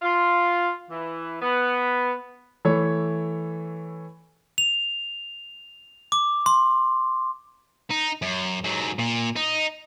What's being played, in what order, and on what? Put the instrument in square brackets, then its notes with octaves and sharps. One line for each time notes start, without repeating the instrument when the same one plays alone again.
[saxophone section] F4
E3
B3
[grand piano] E3 A3 C#5
[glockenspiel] F7
D6
C6
[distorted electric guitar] D#4
F#2
G#2 F#3
A#2
D#4